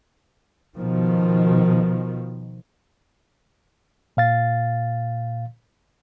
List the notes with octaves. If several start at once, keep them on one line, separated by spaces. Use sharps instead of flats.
B2 D#3 F3
A#2 F5 A6